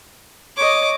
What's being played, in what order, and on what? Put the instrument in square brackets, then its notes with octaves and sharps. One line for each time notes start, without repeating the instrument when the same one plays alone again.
[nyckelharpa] C#5 D#5 [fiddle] D6